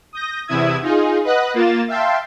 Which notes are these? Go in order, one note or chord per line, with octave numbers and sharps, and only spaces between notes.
D#6 G6 A#6
E2 C3 E4 D#6 E6 G#6
D#4 F4 G#4
B4 D#5 F#5 F#6
A#3 F4 A6 E7
E5 F5 G5 A5 C6